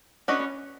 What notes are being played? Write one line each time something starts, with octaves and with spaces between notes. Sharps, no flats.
C#4 D4 F#4 B4 D#5